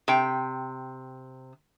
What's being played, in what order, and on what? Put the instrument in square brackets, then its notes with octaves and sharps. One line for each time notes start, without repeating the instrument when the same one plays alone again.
[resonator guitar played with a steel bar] C3 G5